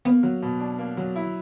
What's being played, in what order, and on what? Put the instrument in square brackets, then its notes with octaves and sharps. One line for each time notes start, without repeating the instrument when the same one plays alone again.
[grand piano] A#3 [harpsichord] B3
[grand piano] F#3
B2
D4
A#3
F#3
E4